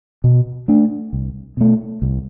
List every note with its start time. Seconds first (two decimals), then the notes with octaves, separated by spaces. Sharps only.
0.24 B2
0.68 A3 D4
1.13 C2
1.57 B2 A3
2.02 C2